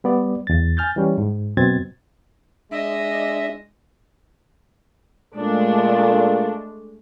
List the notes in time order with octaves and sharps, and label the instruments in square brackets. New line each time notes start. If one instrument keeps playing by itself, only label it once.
[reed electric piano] G3 B3 D5
E2 A6
G#5 F6 G6 A6
E3 G3 C#4
G#2
F#2 B2 F#3 C4 G#6 A6
[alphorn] G#3 [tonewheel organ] D4 [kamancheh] D#5 [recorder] E5
[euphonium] A#2 [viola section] G#3 A3 D4